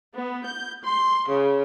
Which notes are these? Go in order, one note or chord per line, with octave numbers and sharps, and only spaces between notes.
B3
G6
C6
C#3